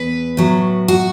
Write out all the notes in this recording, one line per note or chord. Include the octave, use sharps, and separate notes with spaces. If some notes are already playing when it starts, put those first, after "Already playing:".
Already playing: E2 B4
A2 F#3
F#4